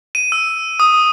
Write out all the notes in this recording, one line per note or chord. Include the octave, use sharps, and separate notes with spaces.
D#7
E6
D#6